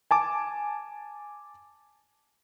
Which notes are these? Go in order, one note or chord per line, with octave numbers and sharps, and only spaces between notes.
G#5 A5 D6